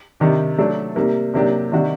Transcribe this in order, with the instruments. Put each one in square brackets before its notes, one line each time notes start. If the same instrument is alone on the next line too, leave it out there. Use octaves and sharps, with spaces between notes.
[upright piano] C3 D#3 G3 D4 G4
F#3 A3 D4 A4
C3 G3 A#3
C3 F#3 A#3 D4 G4
C3 D#3 G3 D4 F#4